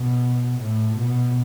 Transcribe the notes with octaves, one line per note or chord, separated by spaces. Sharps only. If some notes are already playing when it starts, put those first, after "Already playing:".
Already playing: B2
A2
B2